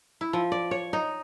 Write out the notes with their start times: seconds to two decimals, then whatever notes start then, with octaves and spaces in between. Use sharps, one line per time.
0.21 E4
0.33 F3
0.52 D5
0.71 C#5
0.93 D#4